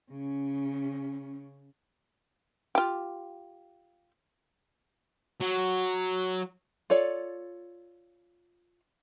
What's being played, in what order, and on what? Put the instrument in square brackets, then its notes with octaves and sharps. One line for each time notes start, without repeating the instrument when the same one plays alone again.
[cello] C#3 C#4
[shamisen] F4 G4
[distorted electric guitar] F#3
[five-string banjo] F4 A4 C#5 D5